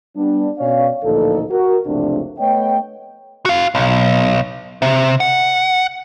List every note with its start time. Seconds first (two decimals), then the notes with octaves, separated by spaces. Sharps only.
0.16 G3 B3 D4
0.59 B2 C#4 C#5 D5 F5
1.04 A1 D2 A#2 F3 D#4 A4
1.50 F#4 A#4
1.86 F#1 C#2 C3 F3 A3 D4
2.39 A3 B3 C#5 D#5 G5
3.46 F#4 F5
3.75 B1
4.82 C3
5.20 F#5